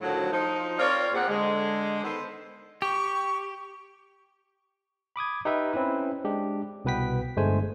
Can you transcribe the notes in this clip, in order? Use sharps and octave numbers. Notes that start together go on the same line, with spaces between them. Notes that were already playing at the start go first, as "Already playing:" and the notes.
A2 D3 D#3 F3 F#3
F3 D#4
C4 F4 A#4 C#5 D5
A#2 A#3 C4 G4 G#4 F#5
D3 G#3
D#3 B3 A4 C5
G4 C#6
B5 D6 D#6 G#6
D#4 G4 B4 E5
C4 C#4 E4 B4
G#3 D4 G4
C2 B2 B3 B4 G5 B6
G1 G#3 A3 D4 C5 G#5